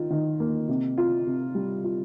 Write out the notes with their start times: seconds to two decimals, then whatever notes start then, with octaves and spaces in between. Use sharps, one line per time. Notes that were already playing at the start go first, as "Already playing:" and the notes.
Already playing: D#3 F4
0.10 D#3
0.40 A#3
0.69 C3
0.98 F4
1.27 C3
1.55 G3
1.84 F4